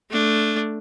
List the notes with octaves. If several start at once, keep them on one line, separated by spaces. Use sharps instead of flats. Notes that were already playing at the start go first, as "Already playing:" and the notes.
A3 D4